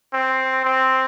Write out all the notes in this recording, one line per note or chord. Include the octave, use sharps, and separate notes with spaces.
C4
C4